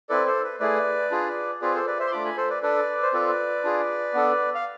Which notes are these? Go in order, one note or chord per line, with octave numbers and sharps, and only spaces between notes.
C4 E4 A4 B4 D5
A4 C5
B4
A3 E4 G#4 B4 D5
D4 F4 G#4
C4 F4 G#4 B4 D5
A4 C5
B4 D5
C5 E5
C6
A3 D4 F4 B5 D6
G#5 B5
A4 C5
B4 D5
D4 A4 B4 D5
C5
C4 F4 A4 B4 D5
D4 F4 G#4
B3 D4 A4
F5